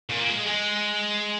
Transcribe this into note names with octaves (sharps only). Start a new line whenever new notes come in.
A#2
A#3
G#3
G#3